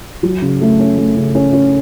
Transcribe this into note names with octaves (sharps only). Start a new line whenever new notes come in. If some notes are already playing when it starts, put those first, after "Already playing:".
F#3
C#3
A3
C#4
A3
C#3
C#4
C#4